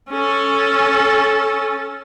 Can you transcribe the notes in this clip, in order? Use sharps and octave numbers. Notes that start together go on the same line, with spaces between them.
C#4 A4